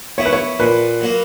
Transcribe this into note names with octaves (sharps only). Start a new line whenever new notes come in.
B3 E4 C#5
B4
C#5
A#2 B4
F#3 A#3